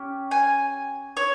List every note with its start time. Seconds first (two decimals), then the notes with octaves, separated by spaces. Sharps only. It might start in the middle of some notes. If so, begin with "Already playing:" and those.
Already playing: C#4 G4
0.31 G#5
1.17 C#5